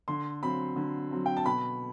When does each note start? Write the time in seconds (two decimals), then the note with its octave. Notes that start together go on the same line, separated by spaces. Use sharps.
0.08 D3 C6
0.43 F#3 C4 B5
0.76 D3
1.11 F#3 C4
1.26 G5
1.37 A5
1.45 B2 B5